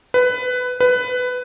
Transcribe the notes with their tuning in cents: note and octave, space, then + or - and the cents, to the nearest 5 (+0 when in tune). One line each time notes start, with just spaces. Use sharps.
B4 +15
B4 +15